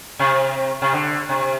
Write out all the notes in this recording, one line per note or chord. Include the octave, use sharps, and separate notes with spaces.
C3
C3
D3
C3